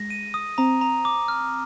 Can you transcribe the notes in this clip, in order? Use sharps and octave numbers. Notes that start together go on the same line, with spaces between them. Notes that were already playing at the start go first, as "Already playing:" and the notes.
Already playing: G#3 A#6
D#7
D#6
C4 A#5
A#5
D6
F6